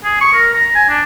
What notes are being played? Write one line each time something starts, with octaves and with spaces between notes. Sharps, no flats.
G#4
C#6
A#4
A#5
G#5
D4